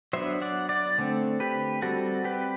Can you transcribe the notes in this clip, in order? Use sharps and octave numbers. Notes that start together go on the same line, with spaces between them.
F#3 B3 D4 C5 E5
D5 F#5
D5 F#5
D3 A3 C4
G4 B4
G3 C4 F#4 A4
G4 B4